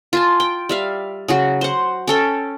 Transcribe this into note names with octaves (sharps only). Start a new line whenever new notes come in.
F4 G#5 A5
G5
G3 E5 F5
C#3 F#3 F#4
C5 F#5
C#4 A4 G5